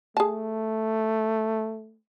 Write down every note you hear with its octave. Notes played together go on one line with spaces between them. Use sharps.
A3 G#4 A5